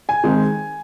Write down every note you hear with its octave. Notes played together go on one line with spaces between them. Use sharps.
G#5
D#3 G#3 C4 D#4